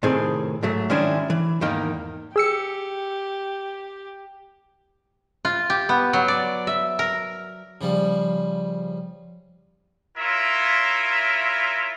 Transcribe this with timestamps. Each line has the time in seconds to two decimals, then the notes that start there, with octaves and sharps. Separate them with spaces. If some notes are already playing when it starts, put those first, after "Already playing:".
0.03 A2 C3 D#3 C4 G#4
0.63 G#2 F#3 A3
0.90 D#3 G#3 C#4 D4 E4
1.30 E3
1.61 E2 G#2 D#3 A#3 D#4 G5
2.36 G4 G#4 E6 C#7
5.45 F4
5.70 G4
5.89 B3
6.13 F#3
6.28 D5
6.67 E5
6.99 A#4
7.81 C#3 F3 G3
10.18 E4 F4 A#4 C#5 E5